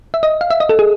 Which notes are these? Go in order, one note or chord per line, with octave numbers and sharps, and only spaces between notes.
E5
D#5
F5
E5
D#5
A4
G#4